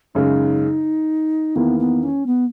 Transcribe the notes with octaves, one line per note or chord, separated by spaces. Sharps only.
F#2 C#3 G#3 D#4
E2 D#3 A#3 B3 E4
B3
C#4
B3